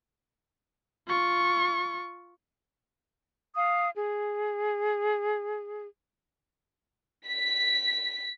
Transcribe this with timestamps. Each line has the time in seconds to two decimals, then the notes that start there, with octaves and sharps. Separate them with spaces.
1.08 F4 C#6
3.57 F5 D#6
3.96 G#4
7.27 B6